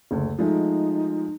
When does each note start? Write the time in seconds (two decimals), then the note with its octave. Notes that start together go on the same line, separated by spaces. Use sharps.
0.11 F#1 D2
0.39 F3 G#3 A3 D#4